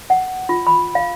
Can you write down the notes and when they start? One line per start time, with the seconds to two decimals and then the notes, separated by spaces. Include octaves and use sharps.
0.10 F#5
0.49 F4
0.67 B5
0.95 F5